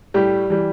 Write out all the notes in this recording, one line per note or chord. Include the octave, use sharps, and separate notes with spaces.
A2 G3 G4
E3 G3